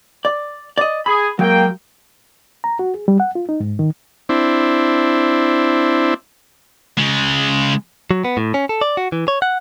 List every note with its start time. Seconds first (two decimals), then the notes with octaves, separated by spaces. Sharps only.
0.25 D5
0.78 D5 D#5
1.06 G#4 B5
1.39 F#3 G#3 A#3 G5
2.64 A#5
2.79 F#4
2.94 G#4
3.08 G3
3.20 F#5
3.35 F4
3.49 D#4
3.60 G#2
3.79 D#3
4.29 C4 D4 E4
6.97 C#3 G#3
8.11 F#3
8.25 B3
8.37 A2
8.54 C#4
8.69 A4
8.81 D5
8.97 F#4
9.12 E3
9.28 C#5
9.42 F#5